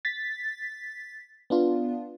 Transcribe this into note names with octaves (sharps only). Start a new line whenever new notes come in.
A6 B6
B3 D4 F4